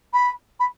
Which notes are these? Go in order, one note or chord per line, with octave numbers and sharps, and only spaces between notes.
B5
B5